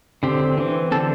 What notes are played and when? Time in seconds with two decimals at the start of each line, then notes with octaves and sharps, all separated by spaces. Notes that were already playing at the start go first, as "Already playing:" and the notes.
0.23 D3 C4 G4
0.58 E3 C4
0.92 D3 C4 A4